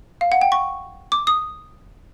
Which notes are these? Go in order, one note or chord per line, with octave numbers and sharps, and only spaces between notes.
F5
F#5
G5
C#6
D6
D#6